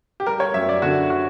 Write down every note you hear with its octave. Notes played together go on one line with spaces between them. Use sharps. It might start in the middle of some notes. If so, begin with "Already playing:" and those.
G4
G3 A#4
C#5
F#2 E5
D5
D3 F#4
F#4